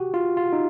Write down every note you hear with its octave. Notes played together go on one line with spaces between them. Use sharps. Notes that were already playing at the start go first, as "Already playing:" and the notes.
Already playing: F#4 G4
F4
F4
D#4